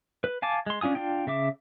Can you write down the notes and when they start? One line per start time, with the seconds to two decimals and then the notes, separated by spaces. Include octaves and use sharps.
0.24 B4
0.42 F5 G#5 A5 D6
0.66 G#3 C6
0.81 C#4 D4 F4 G#5 D#6
0.95 D4 F4 G5
1.27 C#3 E5 D6